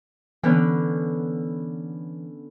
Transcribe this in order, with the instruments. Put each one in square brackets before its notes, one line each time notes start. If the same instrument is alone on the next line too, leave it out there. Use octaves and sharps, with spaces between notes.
[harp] D3 B3 C#4 [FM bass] E3